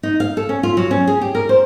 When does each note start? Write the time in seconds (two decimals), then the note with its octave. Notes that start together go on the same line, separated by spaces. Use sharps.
0.03 D#4
0.20 F5
0.37 A4
0.49 C#4
0.63 F4
0.77 F#3
0.91 C#4
1.07 G#4
1.21 G4
1.35 A#4
1.49 C5